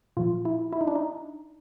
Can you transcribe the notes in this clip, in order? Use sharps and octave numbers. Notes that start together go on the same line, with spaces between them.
A#2 F3 F4
E4
E4
D#4
D4
D#4